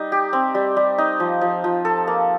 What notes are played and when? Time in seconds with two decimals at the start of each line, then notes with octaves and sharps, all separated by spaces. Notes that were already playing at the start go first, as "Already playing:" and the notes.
Already playing: G3 D#4
0.12 G4
0.33 C4
0.55 G3
0.77 G3
0.98 D#4
1.20 F3
1.41 F3
1.64 F3
1.85 A4
2.08 A#3